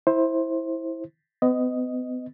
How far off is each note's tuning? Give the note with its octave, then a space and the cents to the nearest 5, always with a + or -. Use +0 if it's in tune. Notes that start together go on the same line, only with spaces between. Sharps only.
E4 -10 C5 +15
B3 +40 D#5 +0